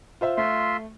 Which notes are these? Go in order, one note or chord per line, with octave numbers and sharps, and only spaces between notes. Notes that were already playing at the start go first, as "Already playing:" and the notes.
F4 C5 E5
A3 F4 E5 C6